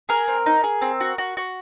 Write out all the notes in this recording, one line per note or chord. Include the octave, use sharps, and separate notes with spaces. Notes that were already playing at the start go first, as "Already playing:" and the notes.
G#4 A#4
C4
D#4
G#4
C4
F#4
F#4
F#4